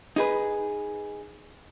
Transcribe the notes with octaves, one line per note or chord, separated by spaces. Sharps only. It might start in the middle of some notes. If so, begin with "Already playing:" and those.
D#4 G#4 B4